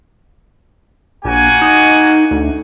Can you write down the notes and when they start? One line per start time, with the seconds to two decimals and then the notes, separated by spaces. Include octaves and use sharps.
1.25 A#1 A#3 F#4 G#5
1.61 D#4
2.31 D2